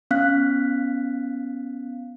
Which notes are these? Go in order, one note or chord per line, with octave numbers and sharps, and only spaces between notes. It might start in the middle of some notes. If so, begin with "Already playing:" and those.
B3 C#4 F5 F#6 B6